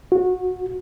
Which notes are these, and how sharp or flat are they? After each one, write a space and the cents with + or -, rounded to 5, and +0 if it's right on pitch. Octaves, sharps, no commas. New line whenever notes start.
F#4 -20